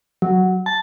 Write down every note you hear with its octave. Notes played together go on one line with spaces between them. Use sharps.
F#3
A5